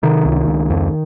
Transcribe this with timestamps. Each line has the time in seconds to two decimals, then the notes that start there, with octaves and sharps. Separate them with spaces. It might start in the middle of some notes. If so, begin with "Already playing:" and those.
0.03 C3 D#3
0.25 C#2
0.47 C#2
0.70 F2